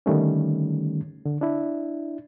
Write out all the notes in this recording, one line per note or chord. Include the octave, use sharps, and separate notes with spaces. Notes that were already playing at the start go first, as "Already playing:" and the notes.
D3 D#3 G3 A3 C#4
D3
D4 E4